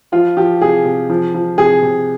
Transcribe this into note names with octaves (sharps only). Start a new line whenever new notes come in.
F3 F4
F3 G4
C3 G#4
C3
F3
F3
C3 G#4
C3